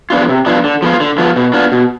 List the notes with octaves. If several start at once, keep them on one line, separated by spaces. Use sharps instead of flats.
F3 B3 D4 F4
C3
F3 B3 D4 F4
D3
F3 B3 F4
D3
F3 B3 F4
B2
B3 D4 F4
B2